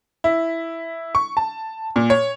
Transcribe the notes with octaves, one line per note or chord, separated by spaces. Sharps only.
E4
C#6
A5
A#2
C#5